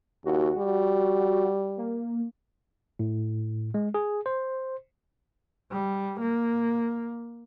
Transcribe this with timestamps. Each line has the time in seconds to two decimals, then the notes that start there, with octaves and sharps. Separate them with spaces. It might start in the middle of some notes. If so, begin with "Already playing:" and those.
0.25 D#2 F#4
0.58 G3
1.77 A#3
2.99 A2
3.74 G#3
3.94 G#4
4.26 C5
5.72 G3
6.21 A#3